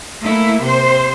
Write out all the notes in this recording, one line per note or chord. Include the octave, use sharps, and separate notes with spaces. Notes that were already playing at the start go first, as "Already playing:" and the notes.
A3 A#3 E4
C3 C5